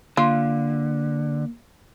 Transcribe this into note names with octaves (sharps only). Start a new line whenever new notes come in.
D3 A#3 F4